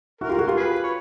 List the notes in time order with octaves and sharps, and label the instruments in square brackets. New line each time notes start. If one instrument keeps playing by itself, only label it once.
[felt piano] E4 F#4 [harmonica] A#4
[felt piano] F4 G4
F#4 G#4
F4 G4
[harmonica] G#4 B4
C#5